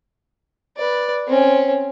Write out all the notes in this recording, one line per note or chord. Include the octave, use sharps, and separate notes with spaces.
B4 D5
C4 C#4